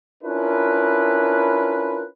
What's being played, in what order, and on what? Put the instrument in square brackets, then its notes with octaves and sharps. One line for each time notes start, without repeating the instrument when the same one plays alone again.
[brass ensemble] C#4 D4 E4 F4 A#4 B4